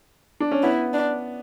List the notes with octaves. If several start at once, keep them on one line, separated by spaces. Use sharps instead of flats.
D4
C#4
B3 E4
D4